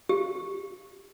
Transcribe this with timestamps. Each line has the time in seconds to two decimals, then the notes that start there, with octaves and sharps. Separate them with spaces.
0.09 G4